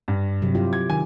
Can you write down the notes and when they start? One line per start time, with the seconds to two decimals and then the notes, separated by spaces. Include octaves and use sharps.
0.08 G2
0.42 C3 F#3
0.55 E4 F4 G4
0.73 G#6
0.90 D#3 G#5